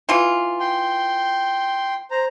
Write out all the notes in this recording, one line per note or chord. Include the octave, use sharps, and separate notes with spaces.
E3 F4
G5 C6
C5 A#5